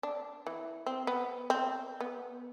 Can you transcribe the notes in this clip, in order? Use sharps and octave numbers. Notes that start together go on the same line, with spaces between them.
D4
E3
C4
B3
C4
B3